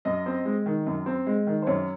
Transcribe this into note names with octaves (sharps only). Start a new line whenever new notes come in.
F#2 D#5
C4
G#3
D#3
F#2
C4
G#3
D#3
C5
F#2 C#5